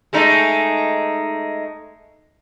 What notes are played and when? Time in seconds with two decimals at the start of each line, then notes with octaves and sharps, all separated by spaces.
0.13 G#3 A3 D#4